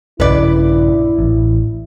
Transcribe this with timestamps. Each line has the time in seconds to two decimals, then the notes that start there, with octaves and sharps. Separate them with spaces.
0.20 A#1 G2 C#3 E4 B4 D5
1.19 A1